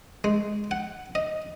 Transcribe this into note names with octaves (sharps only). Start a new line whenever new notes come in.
G#3
F#5
D#5